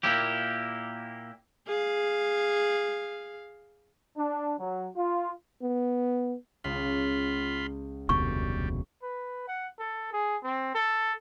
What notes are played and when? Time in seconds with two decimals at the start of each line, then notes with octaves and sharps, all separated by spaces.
0.03 A#2 A#3 E4 G4
1.67 G#4 F5
4.17 D4
4.59 F#3
4.96 F4
5.62 B3
6.64 C#2 F4 B5 C6
8.09 F1 D2 B2 G3 C#6
9.02 B4
9.48 F#5
9.79 A4
10.13 G#4
10.43 C4
10.75 A4